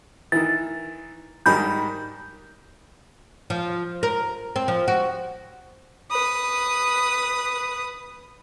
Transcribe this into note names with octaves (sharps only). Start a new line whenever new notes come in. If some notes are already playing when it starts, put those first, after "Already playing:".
D#3 E3 A6
G#2 D#3 G3 B5 G6
F3
A#4
C4
F3
F#4
B4 D#6